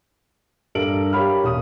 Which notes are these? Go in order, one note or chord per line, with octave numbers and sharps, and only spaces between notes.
G2 A4 A#4 D7 F#7
G4 A#4 C#5 F5 B5 F6
E1 D#6